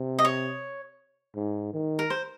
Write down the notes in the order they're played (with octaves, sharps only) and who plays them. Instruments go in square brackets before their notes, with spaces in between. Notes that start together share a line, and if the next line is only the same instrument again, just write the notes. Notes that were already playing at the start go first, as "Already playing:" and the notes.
Already playing: [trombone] C3
[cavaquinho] D#5
C#5
[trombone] G#2
D#3
[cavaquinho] A#4
C5